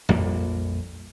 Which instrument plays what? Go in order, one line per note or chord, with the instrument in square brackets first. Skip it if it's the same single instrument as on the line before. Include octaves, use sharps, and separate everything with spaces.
[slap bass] A#1 F2 G3 A#3